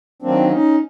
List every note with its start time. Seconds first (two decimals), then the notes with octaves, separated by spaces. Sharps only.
0.22 D#3 F#3 A#3 C4 D4
0.50 C#4 D#4